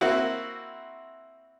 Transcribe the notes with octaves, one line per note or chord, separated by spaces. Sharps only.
A#3 C4 E4 F#4